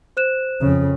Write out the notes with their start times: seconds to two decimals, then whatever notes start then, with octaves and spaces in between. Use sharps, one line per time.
0.17 C5 F#6 E7
0.61 F2 C#3